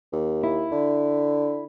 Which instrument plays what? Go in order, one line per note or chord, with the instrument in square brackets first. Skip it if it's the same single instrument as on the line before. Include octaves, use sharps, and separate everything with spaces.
[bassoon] D#2
[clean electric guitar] E4
[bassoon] D3